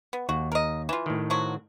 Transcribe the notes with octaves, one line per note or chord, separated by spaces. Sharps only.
B3
D#2 F#4
A#4 D#5
E3 F4
A2 D#3
F3 F#3 F#4